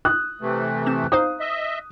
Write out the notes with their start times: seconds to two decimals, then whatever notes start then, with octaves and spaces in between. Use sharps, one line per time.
0.05 D#6 F#6
0.41 C3 E3 A3
0.86 C4 E7
1.12 D#4 C5 F5 D#6
1.40 D#5 E5